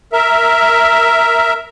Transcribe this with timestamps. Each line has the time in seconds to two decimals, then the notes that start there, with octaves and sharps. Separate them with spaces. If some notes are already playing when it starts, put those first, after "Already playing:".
0.13 A#4 E5